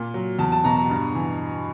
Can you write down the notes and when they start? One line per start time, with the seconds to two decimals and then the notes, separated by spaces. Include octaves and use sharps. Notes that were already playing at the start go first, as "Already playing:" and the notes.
Already playing: A#2
0.14 F#3
0.39 E2 A5
0.52 A5
0.64 B2 A#5
0.77 A#5
0.90 G2
1.15 E3